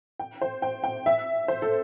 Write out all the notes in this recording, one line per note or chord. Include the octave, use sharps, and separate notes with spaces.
G5
C5
G5
G5
E5
C5
A4